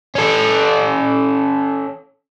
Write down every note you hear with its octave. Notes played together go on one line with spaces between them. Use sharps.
C#4 A4